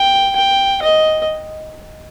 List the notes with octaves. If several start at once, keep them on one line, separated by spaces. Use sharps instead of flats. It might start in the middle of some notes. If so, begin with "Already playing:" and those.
Already playing: G5
G5
D#5